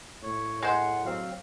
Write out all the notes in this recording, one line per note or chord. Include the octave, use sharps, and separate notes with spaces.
A2 C#5
G#3 C5 F#5
F#3 C4 F5